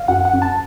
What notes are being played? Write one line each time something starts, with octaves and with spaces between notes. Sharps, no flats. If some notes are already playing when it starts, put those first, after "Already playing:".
Already playing: F5
F#2 F#5
F#5
F#2
A5